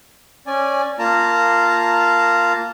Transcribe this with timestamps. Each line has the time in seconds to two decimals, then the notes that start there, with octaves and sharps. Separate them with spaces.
0.47 C#4 D5 G#5
0.99 A#3 F4 A5 A#5